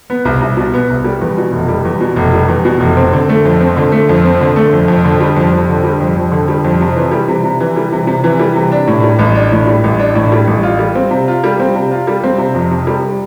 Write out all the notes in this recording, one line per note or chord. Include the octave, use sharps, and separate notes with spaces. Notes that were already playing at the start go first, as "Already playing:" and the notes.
B3
C2
C2
B2
B3
C2
G3
E2
B2
F1
G3
E2
B2
F1
G3
E2
B2
F1
C4
D3
A3
F2
C4
D3
A3
F2
C4
D3
A3
F2
F2
D3
G3
F2
F2
D3
G3
F2
F2
D3
G3
F2
C3
E3
G3
C3
C3
E3
G3
C3
C3
E3
G3
C3
D4
A2
G3
A1
D4
A2
G3
A1
D4
A2
G3
A1
F4
G3
C4
C3
F4
G3
C4
C3
F4
G3
C4
C3
F2
C3
G3